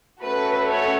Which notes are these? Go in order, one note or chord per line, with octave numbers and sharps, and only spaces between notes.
A3 C#4 F#4 A4 B4
C#5